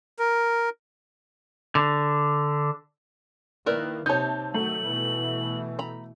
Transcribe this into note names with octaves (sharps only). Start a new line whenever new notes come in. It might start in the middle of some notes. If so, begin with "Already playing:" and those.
A#4
D3
D#3 A#3 E4 A#4 B4 D5
C3 D#4 C#5 A5 G6
D#3 F#3 A3 F#7
B2 E3
A#5 B5